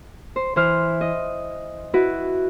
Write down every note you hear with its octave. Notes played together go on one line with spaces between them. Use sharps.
C5
E3 C5 F6
D#5
E4 F#4 B4